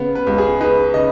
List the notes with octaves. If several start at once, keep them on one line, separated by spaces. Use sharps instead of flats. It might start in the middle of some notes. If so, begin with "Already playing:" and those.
Already playing: C#3 B3
B4
C#2
G#4
D#4 B4
C#3 D#5